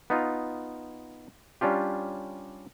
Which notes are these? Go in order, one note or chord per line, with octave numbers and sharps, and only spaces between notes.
B3 D#4 F4
G3 C#4 D4 F4 G4